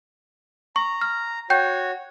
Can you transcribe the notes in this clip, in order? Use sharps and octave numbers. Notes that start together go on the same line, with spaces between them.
A#5 C#6
F6
F#4 C#5 G5 G6